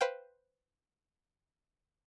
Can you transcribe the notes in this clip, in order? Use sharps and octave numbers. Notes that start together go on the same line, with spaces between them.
B4 C5 F5 G5